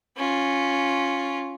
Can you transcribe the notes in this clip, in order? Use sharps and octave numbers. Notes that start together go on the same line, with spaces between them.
C#4 F4